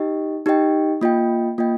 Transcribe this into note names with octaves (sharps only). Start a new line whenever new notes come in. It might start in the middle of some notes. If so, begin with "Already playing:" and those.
Already playing: D#4 G4 D#5 G5
D#4 G4 D#5 G5
A#3 F4 D#5 G5
A#3 F4 D#5 G5